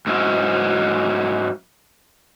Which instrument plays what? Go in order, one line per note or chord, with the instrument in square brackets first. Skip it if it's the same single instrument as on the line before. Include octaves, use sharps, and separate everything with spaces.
[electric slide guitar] G#2 F#3 C#4 E4